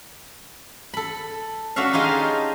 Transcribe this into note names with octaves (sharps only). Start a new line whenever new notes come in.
A4 B5
C#4 D4 F#4 A4 E5 F5
D#4 F4 G4 G#4 D#5 E5